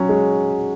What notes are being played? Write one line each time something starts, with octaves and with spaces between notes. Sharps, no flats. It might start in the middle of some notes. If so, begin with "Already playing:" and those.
Already playing: F#3 C#4
G#3